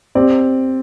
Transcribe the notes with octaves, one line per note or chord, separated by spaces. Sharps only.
C4 G4 D5